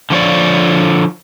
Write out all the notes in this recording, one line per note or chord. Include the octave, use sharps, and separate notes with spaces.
D3 F3 C#5 D5